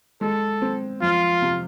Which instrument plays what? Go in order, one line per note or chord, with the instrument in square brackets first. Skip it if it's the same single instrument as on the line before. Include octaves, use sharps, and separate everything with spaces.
[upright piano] G#3 [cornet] A4
[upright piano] C4
[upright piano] F2 [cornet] F4
[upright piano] C3